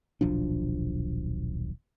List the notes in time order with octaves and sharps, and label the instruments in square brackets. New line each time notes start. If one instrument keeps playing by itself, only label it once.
[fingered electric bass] D#1 B1 F3 D4